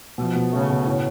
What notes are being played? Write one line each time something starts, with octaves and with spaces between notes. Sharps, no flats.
B2 F3
B2
C#3 A3
B2
A2